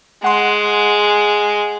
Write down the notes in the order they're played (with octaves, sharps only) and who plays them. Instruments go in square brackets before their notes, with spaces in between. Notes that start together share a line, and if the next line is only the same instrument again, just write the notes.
[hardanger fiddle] G#3 [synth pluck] F#5 C6